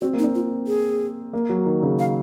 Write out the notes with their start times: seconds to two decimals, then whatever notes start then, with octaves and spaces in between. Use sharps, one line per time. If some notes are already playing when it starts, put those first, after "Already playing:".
0.01 C4 F#4
0.13 A#3
0.19 D#4
0.24 C4
0.35 F4
0.67 G#4
1.33 A#3
1.49 F#3
1.66 D#3
1.83 C#3
1.99 F5